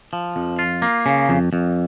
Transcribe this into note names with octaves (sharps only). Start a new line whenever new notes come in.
F3
F2
F4
A#3
C#3
F2
F2